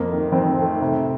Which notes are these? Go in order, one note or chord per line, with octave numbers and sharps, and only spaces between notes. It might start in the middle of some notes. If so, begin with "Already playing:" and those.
Already playing: F2 A#3
D#3 A3
F2 C4
D#3 A3
C3